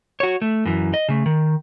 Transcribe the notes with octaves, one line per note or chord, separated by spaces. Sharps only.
F#4 C#5
A3
F#2 E3
D#5
C#3 A3
D#3